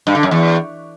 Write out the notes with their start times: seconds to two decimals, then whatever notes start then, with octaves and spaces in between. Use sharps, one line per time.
0.07 G2
0.15 D3
0.23 F#2
0.31 E2